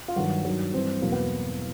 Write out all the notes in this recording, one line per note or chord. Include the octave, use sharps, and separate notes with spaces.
F4
G2 D#3 F#3 F#4
G2 D#3 F#3
G2 E3 C4
E2 B2 F#3 A#3
B3